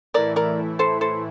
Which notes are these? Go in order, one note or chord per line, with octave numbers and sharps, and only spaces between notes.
A2 E3 A3 E4 A#4 D5
A#4 D5
A4 C5
A4 C5